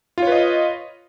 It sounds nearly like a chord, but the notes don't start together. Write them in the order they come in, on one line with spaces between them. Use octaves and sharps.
F4 C#5 B4 D#5